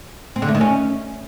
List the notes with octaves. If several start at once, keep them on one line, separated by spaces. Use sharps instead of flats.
C4
D3
A3
D#3
C#4